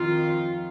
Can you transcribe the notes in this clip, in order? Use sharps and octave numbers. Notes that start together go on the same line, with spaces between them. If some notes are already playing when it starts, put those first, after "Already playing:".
Already playing: F2 D#3 F4